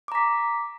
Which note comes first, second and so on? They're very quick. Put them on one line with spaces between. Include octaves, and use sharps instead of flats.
D6 A#5 B6